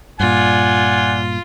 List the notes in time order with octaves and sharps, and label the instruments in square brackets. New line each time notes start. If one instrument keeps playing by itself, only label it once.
[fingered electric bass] G2 A#2 [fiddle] F4 [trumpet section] D5 F#5 G#5